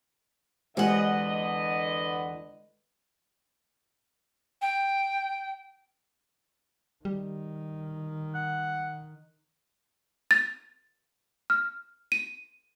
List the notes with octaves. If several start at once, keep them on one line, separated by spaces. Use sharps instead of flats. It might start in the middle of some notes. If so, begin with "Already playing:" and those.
E2 D3 G#3 G4 B4 C5 D#5 F#5
G5
D#3 G3
F#5
A6
F6
D#7